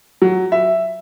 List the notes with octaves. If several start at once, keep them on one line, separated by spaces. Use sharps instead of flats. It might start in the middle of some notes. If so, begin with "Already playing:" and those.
F#3
E5